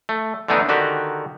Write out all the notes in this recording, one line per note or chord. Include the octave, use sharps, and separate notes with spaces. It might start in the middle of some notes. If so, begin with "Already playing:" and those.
A3
D3 E3 A3 B3 D4 D#4
D3 D#3 F#4 G4